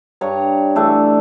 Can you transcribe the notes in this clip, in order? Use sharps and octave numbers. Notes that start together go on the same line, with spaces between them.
G2 C#5 A#5
E3 A3 D4